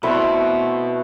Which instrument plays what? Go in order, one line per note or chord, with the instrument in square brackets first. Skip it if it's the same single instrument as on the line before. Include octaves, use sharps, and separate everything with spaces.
[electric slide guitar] B2 [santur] A3 C4 E4